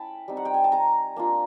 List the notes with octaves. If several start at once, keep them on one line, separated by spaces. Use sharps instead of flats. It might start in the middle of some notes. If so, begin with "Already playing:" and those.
Already playing: A3 C#4 E4 G5 A5 B5
G3 C4 D#4
F#5
G5
G#5
A5
G#5 A#5
A#3 D4 F4